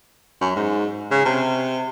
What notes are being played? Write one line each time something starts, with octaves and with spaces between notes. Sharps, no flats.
F#2
G#2
C#3
C3